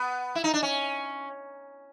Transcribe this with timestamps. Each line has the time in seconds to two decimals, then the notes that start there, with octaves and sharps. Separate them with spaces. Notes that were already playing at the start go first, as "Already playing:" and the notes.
Already playing: B3
0.35 E4
0.44 D#4
0.54 D4
0.63 C#4